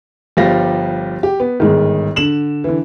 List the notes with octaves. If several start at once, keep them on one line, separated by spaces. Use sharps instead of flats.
G1 F3 G3 G4 F5 A#6
G4
B3
G1 G#2 D#3
D3 E7 F#7
D3 E3